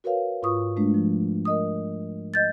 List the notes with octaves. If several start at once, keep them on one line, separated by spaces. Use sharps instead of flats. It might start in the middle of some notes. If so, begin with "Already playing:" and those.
F#4 A#4 B4 C#5 F5
G#2 F4 B4 C#6 D#6
G#3 A3 D4
F3
A#4 D#5 D#6
D#5 G6 A6